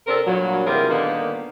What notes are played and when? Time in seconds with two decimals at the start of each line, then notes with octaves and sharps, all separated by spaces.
0.07 C3 C4 D4 A4 A#4
0.26 G2 A#2 F#3
0.66 C3 E3 F4 G4 G#4 A#4
0.89 A#2 D3 D#3 G3 A#3 B3